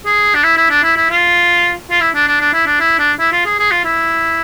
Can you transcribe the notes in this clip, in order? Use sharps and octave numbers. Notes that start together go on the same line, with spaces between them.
G#4
D4
E4
E4
D4
E4
E4
F4
F4
E4
D4
D4
D4
E4
D4
E4
D4
E4
F4
G#4
G#4
F4
E4